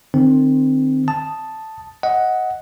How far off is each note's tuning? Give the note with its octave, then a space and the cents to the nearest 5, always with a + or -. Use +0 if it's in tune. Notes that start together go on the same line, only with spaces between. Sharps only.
D#3 -40 C4 +0
A5 +0 D#6 +0
D#5 +20 F#5 +0